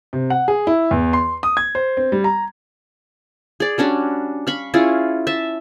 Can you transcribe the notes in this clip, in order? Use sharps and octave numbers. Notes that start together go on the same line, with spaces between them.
C3
F#5
G#4
E4
E2
C6
D#6
G#6
C5
C4
G3
A#5
G#4 D5
G3 C#4 D4 F#4
F5 B5 C#6
C#4 E4 F4 G#4
E5 A5